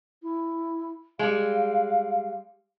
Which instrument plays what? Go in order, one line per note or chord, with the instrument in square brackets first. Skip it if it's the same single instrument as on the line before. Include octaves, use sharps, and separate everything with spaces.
[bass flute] E4
[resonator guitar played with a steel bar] G3 G#3 [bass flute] F5